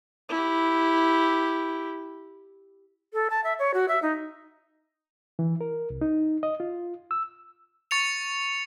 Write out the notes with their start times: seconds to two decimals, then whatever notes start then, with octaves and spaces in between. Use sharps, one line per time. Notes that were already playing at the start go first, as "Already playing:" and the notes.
0.29 E4 G4
3.13 A4
3.30 A5
3.44 E5
3.59 C#5
3.74 F#4
3.88 E5
4.02 D#4
5.39 E3
5.61 A#4
5.90 C2
6.01 D#4
6.43 D#5
6.60 F4
7.11 E6
7.91 C#6 A6 C#7 F7